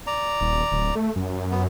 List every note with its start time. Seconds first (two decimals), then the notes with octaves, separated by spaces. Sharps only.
0.07 D5 A#5
0.40 D#1
0.71 D1
0.95 A3
1.16 F#2
1.51 B3